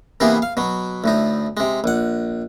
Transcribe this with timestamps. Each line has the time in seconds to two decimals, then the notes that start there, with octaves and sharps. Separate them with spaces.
0.20 C3 E3 A#3 B3 D#4 G#4
0.42 F5
0.57 B2 F#3
1.04 D2 A2 D#4
1.57 C3 G#3
1.84 A#1 F#5